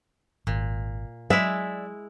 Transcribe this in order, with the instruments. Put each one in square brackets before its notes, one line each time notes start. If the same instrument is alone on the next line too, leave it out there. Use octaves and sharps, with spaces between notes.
[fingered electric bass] G#1 [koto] A#2
[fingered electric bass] F#3 [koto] G#3 E4 [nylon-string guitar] D5 E5